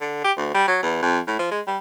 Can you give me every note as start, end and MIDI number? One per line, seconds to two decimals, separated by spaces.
0.01 0.23 50
0.24 0.32 67
0.37 0.51 38
0.54 0.67 55
0.68 0.78 54
0.82 1.00 40
1.02 1.19 41
1.27 1.36 45
1.39 1.50 53
1.51 1.61 56
1.67 1.78 55